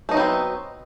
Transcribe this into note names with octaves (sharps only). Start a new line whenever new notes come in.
F#3 A3 B3 C4 D#4